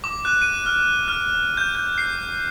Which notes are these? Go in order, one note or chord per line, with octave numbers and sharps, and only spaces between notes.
D6
F#6
D#7
F6
F6
G6
G6
C7